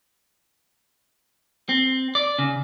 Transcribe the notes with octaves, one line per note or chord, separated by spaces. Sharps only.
C4
D5
C#3